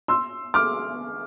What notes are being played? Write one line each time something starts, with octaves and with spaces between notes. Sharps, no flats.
C6 E6
D6 F6